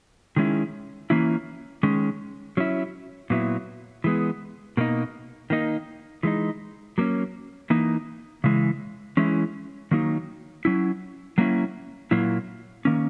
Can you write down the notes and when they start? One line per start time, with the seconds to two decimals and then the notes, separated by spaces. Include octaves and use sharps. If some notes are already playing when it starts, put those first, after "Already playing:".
0.36 D#3 G#3 C#4 E4
1.10 E3 A#3 C#4 E4
1.83 D#3 G#3 C#4
2.57 F#3 C#4 E4
3.30 A#2 F#3 B3 E4
4.04 E3 G#3 B3
4.77 B2 A#3 D#4
5.50 D#3 A#3 D#4
6.23 E3 G#3 D#4
6.98 F#3 A#3 C#4
7.70 E3 A#3 D#4
8.44 C#3 E3 G#3
9.17 E3 G#3 C#4 E4
9.91 D#3 F#3 A#3 D#4
10.65 F#3 C#4 E4
11.38 F#3 A#3 C#4 E4
12.11 A#2 F#3 A#3 E4
12.85 D#3 A#3 C#4